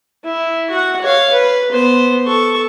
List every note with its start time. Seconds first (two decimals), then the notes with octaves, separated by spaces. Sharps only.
0.25 E4
0.70 F#4 F#5
1.01 C#5 F5
1.32 B4
1.72 B3 C5
2.26 A4 C#6